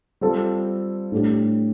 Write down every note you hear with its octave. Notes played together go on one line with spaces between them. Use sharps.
G3 C4 F4 A4
A2 A3 D4 G4